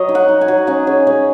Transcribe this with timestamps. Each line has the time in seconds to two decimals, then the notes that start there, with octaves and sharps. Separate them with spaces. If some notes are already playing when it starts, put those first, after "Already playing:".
Already playing: F#3 C#5 D#5
0.09 D#4
0.15 F#5
0.28 D#4
0.41 G#5
0.48 F#3
0.67 C#4 F#5
0.87 C#4 G#4
1.07 C#4 G#4